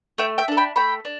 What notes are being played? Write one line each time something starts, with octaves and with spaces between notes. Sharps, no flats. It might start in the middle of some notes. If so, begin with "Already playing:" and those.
A3 E5 G5
E5 G5
D4 A4
G5 B5
A3 G5 B5
D4